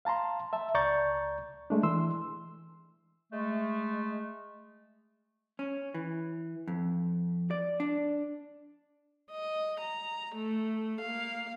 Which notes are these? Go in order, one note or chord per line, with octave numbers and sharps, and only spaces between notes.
F5 A5 A#5 C6
E5 A5
C#2 D5 A#5 C#6 G6 A6
G#3 A3 D4
E3 C6 E6
G#3 A3
C#4
E3
F2
D5
D4
D#5
A#5
A3
A#3 F5